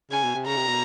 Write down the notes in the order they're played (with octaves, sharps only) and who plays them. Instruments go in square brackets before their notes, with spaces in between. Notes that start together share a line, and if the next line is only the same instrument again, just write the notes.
[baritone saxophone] C#3 [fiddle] G#5
[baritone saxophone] B2
C3
[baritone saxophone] C#3 [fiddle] A#5
[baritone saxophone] C3
B2